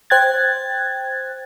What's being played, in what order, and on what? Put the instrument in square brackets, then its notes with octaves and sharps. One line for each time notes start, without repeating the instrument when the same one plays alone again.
[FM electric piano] C5 G5 F#6 G#6 A6